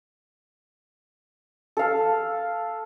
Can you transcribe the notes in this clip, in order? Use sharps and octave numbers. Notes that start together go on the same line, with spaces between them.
A4 F5